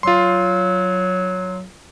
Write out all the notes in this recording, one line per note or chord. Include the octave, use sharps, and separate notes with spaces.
F#3 F4 C6